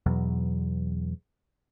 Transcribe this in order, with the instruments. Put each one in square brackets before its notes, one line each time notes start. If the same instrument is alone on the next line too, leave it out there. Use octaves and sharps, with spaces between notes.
[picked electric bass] E2 B2 F#3